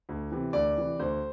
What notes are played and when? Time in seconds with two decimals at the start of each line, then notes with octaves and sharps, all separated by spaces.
0.09 D2
0.32 C3 E3
0.53 D2 D5
0.76 C3 E3
0.99 D2 C5